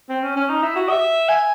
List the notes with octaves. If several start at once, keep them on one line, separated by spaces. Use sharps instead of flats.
C4
C#4
C#4
D#4
E4
F#4
E5
G#5